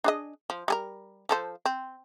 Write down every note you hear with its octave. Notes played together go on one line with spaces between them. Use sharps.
D4 G#4 D#5
F3
G3 G#4 A#4
F3 A4 C5
C4